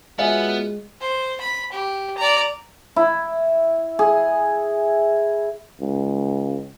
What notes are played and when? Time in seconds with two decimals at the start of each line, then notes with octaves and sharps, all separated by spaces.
0.19 G#3 B3 F4 F#4 C#5 E5 G#5
1.01 C5
1.41 B5
1.73 G4
2.18 D5 A#5
2.96 E4
3.99 G#4
5.81 C#2